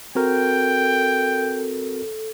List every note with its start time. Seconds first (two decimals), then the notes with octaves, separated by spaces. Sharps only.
0.15 C4 F#4 A4 A#4 G5